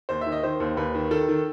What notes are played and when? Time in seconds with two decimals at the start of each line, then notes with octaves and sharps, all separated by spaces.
0.09 D#2 C5
0.21 D#3 E5
0.32 D#5
0.43 D#3 C5
0.60 D#2
0.77 D#2 B4
0.95 D#3
1.11 D#3 A4
1.28 D#3